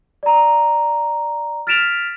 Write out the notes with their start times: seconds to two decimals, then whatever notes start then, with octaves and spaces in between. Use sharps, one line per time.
0.23 D5 A#5
1.67 F6 A6 B6 D7 E7 F7